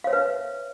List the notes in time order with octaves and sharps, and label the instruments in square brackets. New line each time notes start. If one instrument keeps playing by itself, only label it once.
[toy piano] F5
C#5
E5
B4